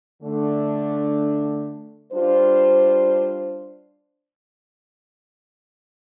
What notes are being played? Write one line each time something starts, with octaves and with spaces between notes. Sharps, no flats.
D3 A3 D4
G3 D4 F4 C5